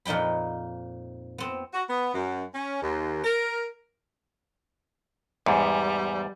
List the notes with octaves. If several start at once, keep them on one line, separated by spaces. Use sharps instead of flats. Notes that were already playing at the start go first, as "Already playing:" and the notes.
F2 A#2 D#4 G5 B5
B3 C4
F#4
B3
F#2
C#4
D#2
A#4
E2 G#2 G3